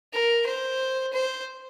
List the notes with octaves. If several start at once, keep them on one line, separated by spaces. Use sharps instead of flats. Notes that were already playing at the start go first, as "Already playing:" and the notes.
A#4
C5
C5